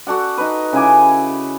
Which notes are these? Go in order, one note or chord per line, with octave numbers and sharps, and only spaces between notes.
F#4 A4 D5 F#5
D#4 B4
C#3 E4 G#5 D6